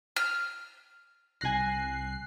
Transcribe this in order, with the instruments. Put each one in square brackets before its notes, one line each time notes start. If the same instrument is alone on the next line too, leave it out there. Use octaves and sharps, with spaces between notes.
[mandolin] F6
[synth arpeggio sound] C2 F#6 C7 [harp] G#5 A#6